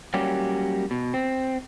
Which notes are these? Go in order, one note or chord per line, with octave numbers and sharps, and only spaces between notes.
F#3 G3 A#3 C#4 G4
B2
C4